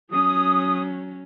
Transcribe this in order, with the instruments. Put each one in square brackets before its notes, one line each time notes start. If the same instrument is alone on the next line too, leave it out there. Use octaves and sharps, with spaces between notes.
[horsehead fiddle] F#3 C#4 [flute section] D#6